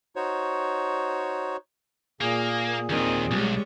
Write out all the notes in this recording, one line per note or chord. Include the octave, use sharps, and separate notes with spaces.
D#4 F#4 C5 C#5
A#2 A#3 G#4
D#2 D#3 C4
B1 G3 G#3 C#5